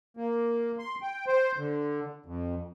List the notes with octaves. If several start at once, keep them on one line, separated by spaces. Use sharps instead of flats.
A#3
C6
G5
C5
D3
F2